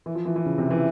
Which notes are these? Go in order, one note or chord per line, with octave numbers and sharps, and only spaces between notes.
E3
F3
E3
E3
C#3
C3
E3